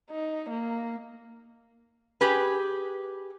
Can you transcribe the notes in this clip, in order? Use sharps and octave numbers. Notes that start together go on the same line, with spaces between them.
D#4
A#3
G4 G#4 B4